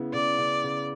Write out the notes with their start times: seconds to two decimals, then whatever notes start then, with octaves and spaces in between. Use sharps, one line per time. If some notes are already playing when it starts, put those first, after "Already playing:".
Already playing: C#3 B3 E4
0.13 C#3 D5
0.38 C#3
0.64 C#3